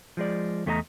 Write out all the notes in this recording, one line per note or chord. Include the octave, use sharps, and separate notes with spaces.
F3 G#3 D5
E2 A3 B3 F4 D#5 A#5